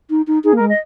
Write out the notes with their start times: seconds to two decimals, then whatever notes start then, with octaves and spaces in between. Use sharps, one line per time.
0.10 D#4
0.27 D#4
0.44 D#4 G#4
0.53 A#3
0.56 A#4
0.60 G#3
0.69 D#5